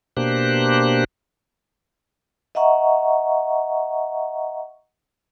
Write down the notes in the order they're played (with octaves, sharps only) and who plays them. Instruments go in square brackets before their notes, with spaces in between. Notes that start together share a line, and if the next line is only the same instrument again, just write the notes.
[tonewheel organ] B2 A#3 D4 G4 C5 F#6
[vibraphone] D#5 E5 F#5 A#5 C#6